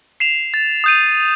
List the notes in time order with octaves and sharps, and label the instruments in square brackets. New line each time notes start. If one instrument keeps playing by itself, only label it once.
[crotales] C7 E7 F7
A6
D#6 G6 D#7